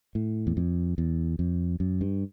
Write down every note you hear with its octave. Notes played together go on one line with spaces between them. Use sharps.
A2
E2
F2
E2
F2
F#2
G2